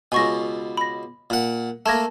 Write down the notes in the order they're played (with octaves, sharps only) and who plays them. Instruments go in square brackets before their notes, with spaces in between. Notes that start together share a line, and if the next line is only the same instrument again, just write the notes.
[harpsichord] C#2 B2 [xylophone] G#5 C#6 A#6
[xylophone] B5 A#6
[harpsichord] A#2 F#5
[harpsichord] A3 A#3 [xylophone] A5 G#6 A#6